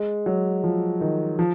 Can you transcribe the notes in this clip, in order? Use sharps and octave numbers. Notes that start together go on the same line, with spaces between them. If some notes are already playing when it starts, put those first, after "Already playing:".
Already playing: G#3
F#3
F3
D#3
F3